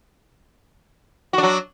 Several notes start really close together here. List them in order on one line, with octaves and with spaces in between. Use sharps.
F#4 D4 F#3